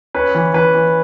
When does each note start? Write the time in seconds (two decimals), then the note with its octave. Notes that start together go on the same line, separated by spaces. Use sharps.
0.15 C#4 B4
0.35 E3
0.54 E3 B4
0.74 E3